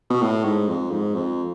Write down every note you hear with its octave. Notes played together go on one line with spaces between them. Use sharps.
B2
A2
G#2
F2
G#2
F2